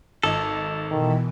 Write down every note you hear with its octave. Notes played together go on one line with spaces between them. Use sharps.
G#1 A4 D#5
B2 D#3 E3